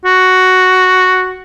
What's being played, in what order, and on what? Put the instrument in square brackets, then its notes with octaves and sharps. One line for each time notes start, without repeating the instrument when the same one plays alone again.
[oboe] F#4